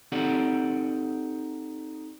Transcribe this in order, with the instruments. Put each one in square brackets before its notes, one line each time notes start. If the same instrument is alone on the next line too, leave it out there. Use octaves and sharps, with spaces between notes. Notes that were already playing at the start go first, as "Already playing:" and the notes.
[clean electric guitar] C4 D#4 G4 A4 D5 F#5